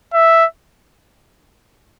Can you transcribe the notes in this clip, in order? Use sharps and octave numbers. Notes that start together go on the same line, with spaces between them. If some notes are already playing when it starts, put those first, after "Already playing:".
E5